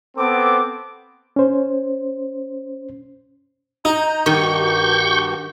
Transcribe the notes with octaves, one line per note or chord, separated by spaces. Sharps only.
B3 C4 A4 D6
C#4 C5
D#4 A#5 G6
G2 D#3 F#4 G4 C#6 G6